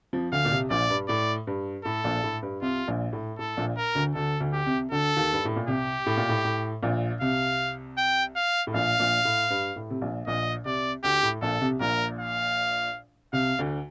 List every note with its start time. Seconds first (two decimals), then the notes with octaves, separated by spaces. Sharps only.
0.13 F2 F3
0.32 D2 D3 F5
0.45 A#2
0.51 C2 C3
0.70 A#1 A#2 D5
0.90 G2
1.08 A2 D5
1.47 G2
1.85 A2 A4
2.04 A#1 A#2
2.24 A2
2.43 G2
2.62 C2 C3 F4
2.88 A#1 A#2
3.13 A2
3.39 A2 A4
3.57 A#1 A#2
3.77 A#4
3.95 D2 D3
4.14 D2 D3 A4
4.40 D2 D3
4.53 G4
4.66 C2 C3
4.91 D2 D3 A4
5.17 D#2 D#3
5.33 G2
5.45 A2
5.56 A#2
5.67 C2 C3 G4
6.06 A2
6.17 A#2
6.29 A2
6.45 A2
6.83 A#1 A#2
7.21 C2 C3 F5
7.98 G5
8.36 F5
8.67 A2
8.74 A#1 A#2 F5
8.99 A#1 A#2
9.25 A2
9.50 G2
9.76 A2
9.90 C3
10.02 A#1 A#2
10.27 A#1 A#2 D#5
10.65 C2 C3 D5
11.04 D2 D3 G4
11.23 A2
11.42 A#1 A#2 A4
11.61 C2 C3
11.80 A#1 A#2 A#4
12.18 F5
13.33 C2 C3 F5
13.59 D2 D3